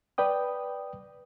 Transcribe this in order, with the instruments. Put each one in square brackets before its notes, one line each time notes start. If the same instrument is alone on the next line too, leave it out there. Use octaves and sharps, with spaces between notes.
[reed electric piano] B4 D5 G5 D#6